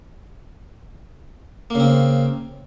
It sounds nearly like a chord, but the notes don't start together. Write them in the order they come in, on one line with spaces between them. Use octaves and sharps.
A#3 C#3 C4